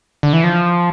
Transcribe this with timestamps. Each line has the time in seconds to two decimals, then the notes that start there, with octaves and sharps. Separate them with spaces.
0.23 D3
0.33 E3
0.44 F3